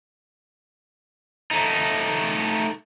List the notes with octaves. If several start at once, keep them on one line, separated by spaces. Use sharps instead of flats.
A3 D#4